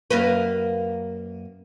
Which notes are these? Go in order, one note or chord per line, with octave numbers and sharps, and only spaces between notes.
F#2 A#3 B4